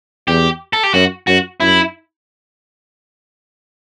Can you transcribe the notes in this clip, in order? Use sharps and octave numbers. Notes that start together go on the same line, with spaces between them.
E2 G4
A4
G4
F#2 F#4
F#2 F#4
F#2 E4